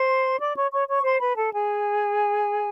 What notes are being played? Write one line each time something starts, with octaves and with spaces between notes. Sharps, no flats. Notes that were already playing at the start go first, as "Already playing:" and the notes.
Already playing: C5 C6
D5 D6
C#5 C#6
C#5 C#6
C#5 C#6
C5 C6
B4 B5
A4 A5
G#4 G#5